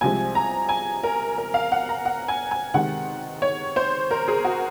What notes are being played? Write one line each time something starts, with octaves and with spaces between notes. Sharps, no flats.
C2 C3 F3 G#3 G#5
A#5
G#5
A#4
A#4
F5
F#5
A#5
F#5
G#5
G#5
C3 D#3 G#3 F#5
C#5
C5
A#4
G#4
F#4